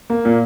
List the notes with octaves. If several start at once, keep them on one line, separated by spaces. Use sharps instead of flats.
A#3
A#2